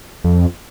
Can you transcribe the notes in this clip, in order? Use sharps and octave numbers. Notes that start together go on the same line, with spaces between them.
F2